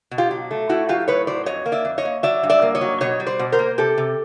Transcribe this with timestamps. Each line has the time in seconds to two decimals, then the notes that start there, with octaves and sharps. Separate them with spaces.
0.11 B2
0.18 F4 G4
0.31 F#3
0.51 A3
0.69 A2 E4 F#4
0.89 F#3 F4 G4
1.08 A2 B4 C#5
1.27 F#3 C5 D5
1.46 F2 C#5 D#5
1.66 A#3
1.72 D5 E5
1.85 F2
1.98 C#5 D#5
2.05 A#3
2.23 F#3 D5 E5
2.43 G2
2.50 D5 E5
2.62 A#3
2.75 C#5 D#5
2.81 F#3
3.01 B2 C#5 D#5
3.20 G3
3.26 C5 D5
3.39 B2
3.52 A#4 C5
3.59 A#3
3.78 C3 G4 A4
3.98 C3